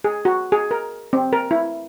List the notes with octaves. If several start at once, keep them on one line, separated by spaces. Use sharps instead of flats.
G#4
F#4
G#4
A#4
C4
A#4
E4